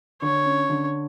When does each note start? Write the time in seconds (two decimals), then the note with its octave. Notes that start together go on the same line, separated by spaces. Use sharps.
0.22 D3 C#5
0.46 C#4
0.70 D3